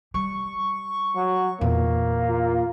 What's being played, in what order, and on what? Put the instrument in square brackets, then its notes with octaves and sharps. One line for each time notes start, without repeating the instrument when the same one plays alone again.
[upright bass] G3 [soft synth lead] C#6
[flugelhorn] F#3
[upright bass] E2 A#2 [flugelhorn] A#3
[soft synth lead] F4